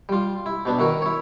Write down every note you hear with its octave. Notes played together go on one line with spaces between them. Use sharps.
G3 F4
E4
B2 B3 D4
D#3 E4 F#4 A#4
E4 C#5